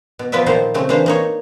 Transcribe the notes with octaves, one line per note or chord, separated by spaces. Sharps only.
B2
F3 B3 F4 B4 D5 E5
A#2 D#3 F3 A#3 C5
C#3 A3 C4
E3 A#3 D4 C5
A#3 D#4 C#5